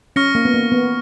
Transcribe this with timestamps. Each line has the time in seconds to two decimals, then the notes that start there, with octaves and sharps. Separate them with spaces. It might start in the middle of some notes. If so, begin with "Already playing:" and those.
0.16 C#4 C#6 F6 A#6 C#7
0.35 A#3
0.45 B3
0.54 A#3
0.72 B3